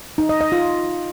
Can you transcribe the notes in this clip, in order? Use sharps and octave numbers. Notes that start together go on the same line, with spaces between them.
D#4
D#5
D#5
F4